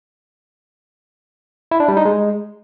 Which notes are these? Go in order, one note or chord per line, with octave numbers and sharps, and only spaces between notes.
E4
D4
G3
D#4
G#3